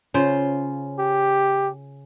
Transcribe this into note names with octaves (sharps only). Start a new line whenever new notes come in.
C#3 F4 C5
G4